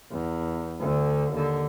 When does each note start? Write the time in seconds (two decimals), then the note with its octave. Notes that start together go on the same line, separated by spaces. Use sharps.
0.11 E2
0.80 D2 D3
1.33 D#2 D3